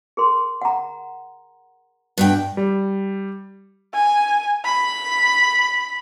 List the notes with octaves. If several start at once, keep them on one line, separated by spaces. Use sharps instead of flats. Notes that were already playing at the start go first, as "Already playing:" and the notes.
G#4 A#4 C6
F#5 A#5
G2 B2 G5
G3
G#5
B5